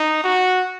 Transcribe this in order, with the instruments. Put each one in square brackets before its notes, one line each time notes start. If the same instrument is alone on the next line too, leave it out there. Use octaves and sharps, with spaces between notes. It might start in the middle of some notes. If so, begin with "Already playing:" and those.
Already playing: [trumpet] D#4
F#4